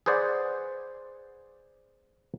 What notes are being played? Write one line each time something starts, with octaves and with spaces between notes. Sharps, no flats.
G#4 B4 C5 D5 F#5